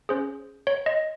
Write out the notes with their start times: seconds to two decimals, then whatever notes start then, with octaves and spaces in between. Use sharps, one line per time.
0.09 C#4 G#4 C5
0.67 C#5
0.86 D#5